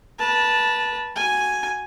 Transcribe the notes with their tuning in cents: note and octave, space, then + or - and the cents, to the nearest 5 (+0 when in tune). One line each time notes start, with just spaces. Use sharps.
B4 -25 A5 +0
F#4 +0 G#5 +0